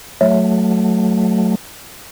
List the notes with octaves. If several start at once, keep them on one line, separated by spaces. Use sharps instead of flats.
F#3 A3